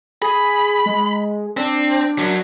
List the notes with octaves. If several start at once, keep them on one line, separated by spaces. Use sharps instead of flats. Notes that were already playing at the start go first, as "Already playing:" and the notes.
G#4 B5
G#3
C4 D4
F#2 F#3